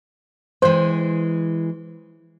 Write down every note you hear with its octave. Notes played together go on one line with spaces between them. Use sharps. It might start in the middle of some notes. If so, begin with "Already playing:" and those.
E3 G#3 C5